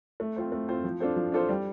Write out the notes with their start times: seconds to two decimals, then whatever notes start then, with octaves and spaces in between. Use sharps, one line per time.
0.20 A3
0.36 C4 F4 C5
0.52 A3
0.68 C4 F4 C5
0.84 F3
1.00 D4 F4 A4 C5
1.16 F3
1.32 D4 F4 A4 C5
1.49 G3